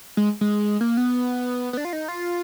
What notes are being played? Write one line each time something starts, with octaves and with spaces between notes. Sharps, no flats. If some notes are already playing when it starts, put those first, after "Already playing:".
G#3
G#3
A#3
B3
B3
D4
F4
D#4
F4